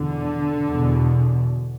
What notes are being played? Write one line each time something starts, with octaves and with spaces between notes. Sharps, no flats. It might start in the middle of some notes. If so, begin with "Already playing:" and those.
Already playing: E2 B2 D3
E2 B2